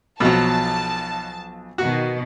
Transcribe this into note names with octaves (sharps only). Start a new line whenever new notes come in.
B1 B2 F3 F#3 A5
B2 D#3 F#4